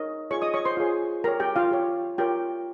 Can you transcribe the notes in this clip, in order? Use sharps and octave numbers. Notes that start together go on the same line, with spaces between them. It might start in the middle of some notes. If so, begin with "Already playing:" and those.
Already playing: D#4 A#4 C#5 D#5
F4 G#4 C#5 C#6
D#5 D#6
C#5 C#6
C5 C6
F4 G#4 C#5
G4 A#4 C#5 A#5
G4 G5
F4 F5
G4 C#5
F4 G4 A#4 C#5 G5